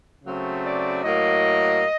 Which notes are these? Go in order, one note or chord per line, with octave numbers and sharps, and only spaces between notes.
C#3 F#3 A3 C4
D5
A2 F#3 A#3 D#5